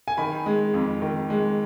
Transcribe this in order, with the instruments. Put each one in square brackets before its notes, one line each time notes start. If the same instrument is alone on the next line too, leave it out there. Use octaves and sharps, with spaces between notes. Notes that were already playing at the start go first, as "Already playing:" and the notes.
[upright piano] G#5
D#3 B5
G#3
F2
D#3
G#3